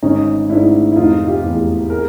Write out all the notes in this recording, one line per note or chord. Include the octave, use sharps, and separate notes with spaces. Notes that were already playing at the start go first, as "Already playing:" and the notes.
G#1 C#4 D#4
G#2 D4 E4
E4
F1 D#4 F4
F4 G4
E2
G#4 A#4